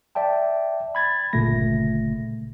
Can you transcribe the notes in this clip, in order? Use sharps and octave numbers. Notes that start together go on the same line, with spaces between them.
D5 E5 G5 A5
B5 G#6 A6
G1 A#2 C#3 A3 A#6